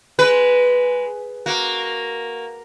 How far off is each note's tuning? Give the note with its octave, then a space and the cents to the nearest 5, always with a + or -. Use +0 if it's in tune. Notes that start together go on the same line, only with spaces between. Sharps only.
G#3 +0 B4 +0
A#3 +0 F#4 +0